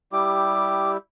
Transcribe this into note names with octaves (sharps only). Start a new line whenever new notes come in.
G3 E4 G4 D6